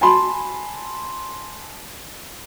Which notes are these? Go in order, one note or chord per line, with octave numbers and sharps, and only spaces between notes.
G#5 A5 B5 C6